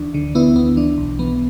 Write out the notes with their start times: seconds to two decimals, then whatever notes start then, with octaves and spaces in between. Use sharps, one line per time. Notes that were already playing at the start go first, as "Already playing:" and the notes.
Already playing: D2 E3 D4
0.14 D3
0.35 D2 B3 E4
0.56 D2 B3
0.77 E3 D4
0.98 B1
1.19 E3 B3